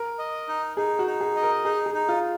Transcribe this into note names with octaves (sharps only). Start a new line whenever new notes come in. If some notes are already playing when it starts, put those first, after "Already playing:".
Already playing: A#4
D#5
D#4
D#4 G#4
F#4
D#4
G#4
D#5
A#4
D#4 G#4
G#4
D#4
F4